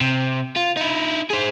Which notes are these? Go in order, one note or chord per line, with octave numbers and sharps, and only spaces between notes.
C3
F4
D#4 E4
G#4 C5